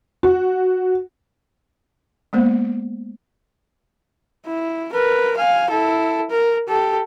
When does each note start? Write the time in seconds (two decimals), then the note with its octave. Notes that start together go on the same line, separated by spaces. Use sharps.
0.23 F#4
2.33 G#3 A#3 B3 C5
4.46 E4
4.93 A#4 B4
5.37 F5 G#5
5.70 E4 A4
6.30 A#4
6.68 G4 A4